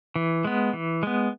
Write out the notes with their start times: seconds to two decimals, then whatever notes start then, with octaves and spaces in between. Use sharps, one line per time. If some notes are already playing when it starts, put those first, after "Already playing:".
0.16 E3
0.45 G#3 B3
0.73 E3
1.03 G#3 B3